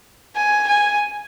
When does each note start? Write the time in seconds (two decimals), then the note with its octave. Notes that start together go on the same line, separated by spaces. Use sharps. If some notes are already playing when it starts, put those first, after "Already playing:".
0.36 G#5
0.68 G#5